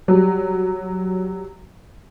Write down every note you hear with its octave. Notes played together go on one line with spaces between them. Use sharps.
F#3 G3